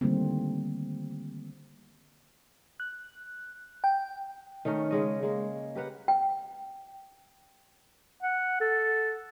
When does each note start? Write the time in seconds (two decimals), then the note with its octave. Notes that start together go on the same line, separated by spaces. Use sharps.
0.01 D3 D#3 G3 A3 A#3 C4
2.80 F#6
3.84 G5
4.65 D#3 A3 C#4 A#4
4.91 C#3 G#3 D#5
5.22 G#3 A#3
5.75 G4 A#4 B4 F#5
6.08 G5
8.22 F#5
8.61 A4